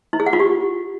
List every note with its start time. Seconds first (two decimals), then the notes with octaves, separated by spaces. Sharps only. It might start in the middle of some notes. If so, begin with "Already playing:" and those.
0.13 E4
0.20 G#4
0.26 F#5
0.33 F4
0.40 G4